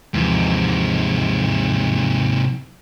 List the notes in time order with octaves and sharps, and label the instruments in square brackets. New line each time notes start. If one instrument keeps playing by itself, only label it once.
[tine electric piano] D#2 E3 F3 [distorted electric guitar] G#2 C3